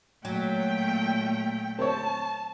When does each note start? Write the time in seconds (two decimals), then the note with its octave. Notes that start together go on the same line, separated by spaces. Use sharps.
0.25 A#2 F#3 A3 G5
1.79 C4 C#5 A5